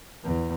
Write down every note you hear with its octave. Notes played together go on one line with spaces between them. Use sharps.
E2